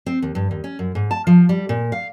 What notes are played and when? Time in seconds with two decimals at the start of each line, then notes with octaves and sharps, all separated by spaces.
0.06 C4
0.22 D#2
0.35 G2
0.51 D#2
0.64 C#4
0.79 F#2
0.95 G#2
1.11 A5
1.27 F3
1.49 G3
1.69 A#2
1.92 F5